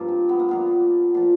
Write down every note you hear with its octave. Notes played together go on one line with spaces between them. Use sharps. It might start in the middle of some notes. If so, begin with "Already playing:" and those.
Already playing: G2 F3 A#3
C4
B3
A#3
A#2 F3 B3
A#2 F3